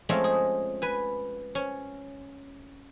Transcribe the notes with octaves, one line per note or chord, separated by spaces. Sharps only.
F3 G#3 A3 C4 C#4 F4
G#4
B4 G#5
C#4